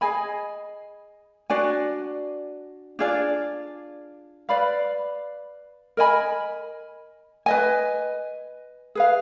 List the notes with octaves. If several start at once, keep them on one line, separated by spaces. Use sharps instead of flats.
G#4 D#5 G#5 B5
D4 F#4 D5 G#5
D4 F4 G#4 D5
B4 D5 F5 B5
A#4 D#5 G#5 B5
B4 D#5 G#5
G#4 B4 F5